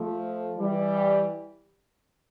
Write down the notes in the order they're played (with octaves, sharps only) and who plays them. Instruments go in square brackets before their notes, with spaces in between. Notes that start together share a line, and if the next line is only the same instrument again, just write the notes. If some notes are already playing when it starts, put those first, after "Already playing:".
Already playing: [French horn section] F3 A3
E3 G3